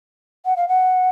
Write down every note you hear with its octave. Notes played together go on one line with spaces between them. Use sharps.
F#5
F5
F#5